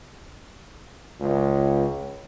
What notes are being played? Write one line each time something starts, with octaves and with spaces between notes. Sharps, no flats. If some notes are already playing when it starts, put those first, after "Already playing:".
C#2